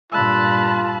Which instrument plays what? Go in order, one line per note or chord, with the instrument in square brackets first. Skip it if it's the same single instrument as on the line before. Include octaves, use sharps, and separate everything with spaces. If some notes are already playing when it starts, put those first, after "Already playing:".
[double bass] G2 A#2 [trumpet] F4 [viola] A5 B5 [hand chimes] E6 F#6